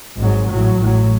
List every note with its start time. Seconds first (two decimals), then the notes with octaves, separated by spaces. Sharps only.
0.17 G#1 G#2 F#3
0.48 A1 A2 F#3
0.80 A1 A2 F#3